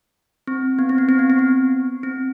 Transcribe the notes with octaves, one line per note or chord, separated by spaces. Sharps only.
C4
B3
C4
B3
C4
B3
C4
B3
C4